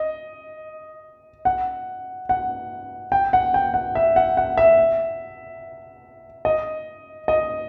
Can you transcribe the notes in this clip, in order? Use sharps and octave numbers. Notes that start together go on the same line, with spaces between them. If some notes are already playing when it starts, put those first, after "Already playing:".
Already playing: D#5
F#5
F#5
G5
F#5
G5
F#5
E5
F#5
F#5
E5
D#5
D#5